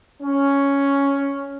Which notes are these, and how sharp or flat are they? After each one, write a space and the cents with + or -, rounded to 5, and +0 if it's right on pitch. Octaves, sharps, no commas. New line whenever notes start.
C#4 +5